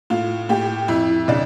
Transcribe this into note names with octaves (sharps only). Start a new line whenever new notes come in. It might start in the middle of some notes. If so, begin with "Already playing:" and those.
A2 F4
A2 G4
F2 E4
C#3 D4